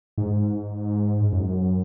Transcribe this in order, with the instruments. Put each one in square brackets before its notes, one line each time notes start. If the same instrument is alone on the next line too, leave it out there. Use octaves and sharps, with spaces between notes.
[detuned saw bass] G#2
F#2